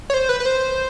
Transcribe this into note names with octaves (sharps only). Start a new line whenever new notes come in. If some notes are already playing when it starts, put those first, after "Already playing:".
C#5
C5
B4
B4
C5